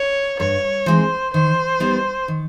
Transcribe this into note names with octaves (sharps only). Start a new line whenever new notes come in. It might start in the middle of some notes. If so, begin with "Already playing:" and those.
Already playing: C#5
G2 C#5
E3 G#3 C4 D#4 C5
D#3 C5
G3 B3 D#4
D#3